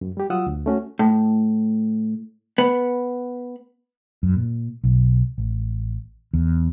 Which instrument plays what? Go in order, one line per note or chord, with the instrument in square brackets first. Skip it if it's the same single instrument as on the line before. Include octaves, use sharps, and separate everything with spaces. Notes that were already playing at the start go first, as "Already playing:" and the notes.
[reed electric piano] F#2
G3 G4
F#3 F4 F#5 D#6 E6
D2
A3 C#4 F#4
[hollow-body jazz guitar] A2
B3
[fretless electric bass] F#2
A#2
B1
A1
E2